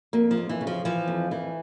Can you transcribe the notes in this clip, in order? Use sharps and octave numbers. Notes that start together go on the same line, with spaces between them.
F2 A#3
F3
F2
E3
C#3
F3
E3 F3
F2
E3